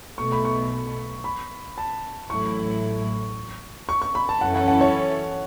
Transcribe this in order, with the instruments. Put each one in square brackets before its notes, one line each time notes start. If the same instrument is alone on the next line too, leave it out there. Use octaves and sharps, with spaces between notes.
[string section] B1 B2 A3 [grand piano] C#6
[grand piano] B5
C#6
B5
A5
[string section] A1 A2 F#3 A3 E4 [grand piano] C#6
[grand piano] C#6
C#6
B5
A5
[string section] F#2 E3 C#4 E4 A4 [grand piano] F#5
[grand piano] F#5
F#5
C#5